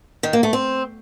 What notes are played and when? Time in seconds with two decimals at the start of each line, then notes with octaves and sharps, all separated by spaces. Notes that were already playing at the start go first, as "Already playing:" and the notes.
0.23 D#3
0.33 A#3
0.43 A3
0.53 C4